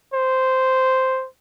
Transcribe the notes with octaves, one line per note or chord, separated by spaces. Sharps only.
C5